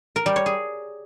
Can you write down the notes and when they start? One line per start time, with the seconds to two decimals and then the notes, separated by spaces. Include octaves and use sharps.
0.16 A#4
0.26 G3
0.36 C#5
0.46 G#4